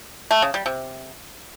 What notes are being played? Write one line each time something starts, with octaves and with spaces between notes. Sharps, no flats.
A3
C#3
G3
C3